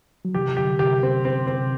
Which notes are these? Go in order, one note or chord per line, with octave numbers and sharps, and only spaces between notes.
F#3
C3 E3 G4
D3 F#3 G4
C3 E3 G4
C4
C4
C4
C3